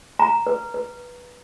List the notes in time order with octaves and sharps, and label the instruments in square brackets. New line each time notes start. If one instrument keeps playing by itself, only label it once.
[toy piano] A#5
B4
B4